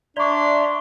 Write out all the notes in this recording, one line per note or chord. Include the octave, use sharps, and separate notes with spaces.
D4 D5 E5 A#5 C6 C#6